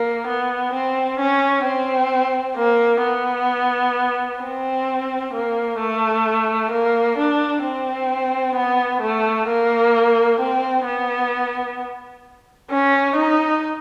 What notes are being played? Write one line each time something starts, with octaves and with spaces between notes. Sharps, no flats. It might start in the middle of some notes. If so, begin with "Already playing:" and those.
Already playing: A#3
B3
C4
C#4
C4
A#3
B3
C4
A#3
A3
A#3
D4
C4
B3
A3
A#3
C4
B3
C#4
D#4